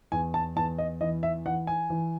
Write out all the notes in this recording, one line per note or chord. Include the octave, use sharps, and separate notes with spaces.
E2 G#5
A5
E2 A5
D#5
E3 D#5
E5
E3 F#5
G#5
E3